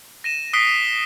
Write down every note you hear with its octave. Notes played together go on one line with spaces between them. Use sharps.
A#6 D#7 E7
D#6 F#6 B6 C7 D7 G7